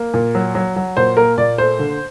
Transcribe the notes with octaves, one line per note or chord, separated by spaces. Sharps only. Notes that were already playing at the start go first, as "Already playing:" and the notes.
Already playing: A#3
A#2
F#3
F#3
F#3
A#2 C5
A#3 A#4
A#2 D5
A3 C5
D3